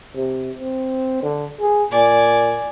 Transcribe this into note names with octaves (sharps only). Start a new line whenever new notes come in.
C3
C4
D3
G#4
A#2 D5 G#5